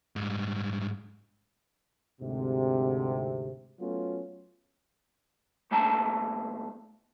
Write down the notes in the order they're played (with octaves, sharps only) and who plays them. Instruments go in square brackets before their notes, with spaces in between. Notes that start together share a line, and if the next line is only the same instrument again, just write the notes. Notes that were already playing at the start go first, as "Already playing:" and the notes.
[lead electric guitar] G#2 G3
[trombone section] D2 G#2 C3
F#3 A3 B3 C#4 F4
[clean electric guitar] B1 A3 A#3 A5 A#5